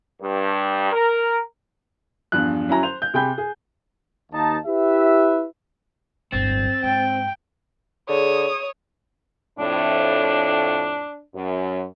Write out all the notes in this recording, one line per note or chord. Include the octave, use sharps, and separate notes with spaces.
G2
A#4
E2 G2 F3 F#6
F#3 C#4 E4 A#5
C5 F7
G6
C3 G#4 G5 B5 G6
G#4
D#2 D#4 A5
E4 G4 B4 E5
D1 G1 C4 A6
G#2 G5
D3 G#4 C#5 D#6
F2 A2 D4
F#2